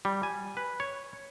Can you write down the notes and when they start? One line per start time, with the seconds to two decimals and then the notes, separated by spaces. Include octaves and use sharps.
0.05 G3
0.23 G#5
0.57 B4
0.80 C#5